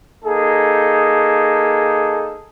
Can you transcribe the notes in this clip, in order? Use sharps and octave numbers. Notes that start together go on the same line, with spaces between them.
A#3 D#4 G#4 A4